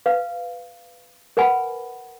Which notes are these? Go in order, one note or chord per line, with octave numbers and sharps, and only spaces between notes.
B4 F5
A#4 B4 F#5 G#5 B5